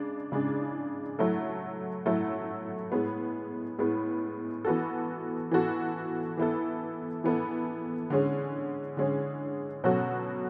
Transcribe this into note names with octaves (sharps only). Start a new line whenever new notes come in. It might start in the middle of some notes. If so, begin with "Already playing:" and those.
Already playing: C#3 G#3 D4
C#3 G#3 D4 G#4
F#3 A3 E4 A4
F#3 A3 E4 A4
A2 G#3 B3
A2 G#3 B3
E3 B3 F#4 A4
E3 B3 F#4 A4
E3 B3 E4 A4
E3 B3 E4 A4
D3 G#3 C#4 G#4
D3 G#3 C#4 G#4
B2 F#3 C#4 F#4 A4